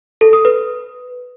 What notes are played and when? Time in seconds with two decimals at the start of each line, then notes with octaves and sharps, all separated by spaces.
0.21 A4
0.33 D#6
0.45 B4